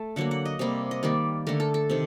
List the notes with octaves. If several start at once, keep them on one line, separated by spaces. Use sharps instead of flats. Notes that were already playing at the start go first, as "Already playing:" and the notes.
Already playing: A3 A5
D3 F#3 A#3 F#5
F#5
D#5
C3 G3 A#3
D#5
D#3 G3 A#3 D5
D3 A3 A#4
A4
A4
C3 D#3